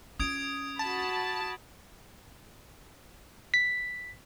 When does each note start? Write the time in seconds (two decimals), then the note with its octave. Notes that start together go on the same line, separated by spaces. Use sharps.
0.20 C#4 F4 D#6 G#6 D7
0.79 F#4 A5 B5
3.54 B6